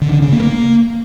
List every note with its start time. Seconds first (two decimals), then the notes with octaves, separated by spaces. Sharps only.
0.02 D3
0.12 D3
0.22 C#3
0.32 A#3
0.42 A#3